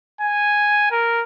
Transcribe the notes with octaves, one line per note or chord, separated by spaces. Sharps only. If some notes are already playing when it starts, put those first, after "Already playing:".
G#5
A#4